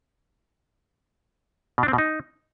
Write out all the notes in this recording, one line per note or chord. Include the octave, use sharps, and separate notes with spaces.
B2
D4
C4
B2
D#4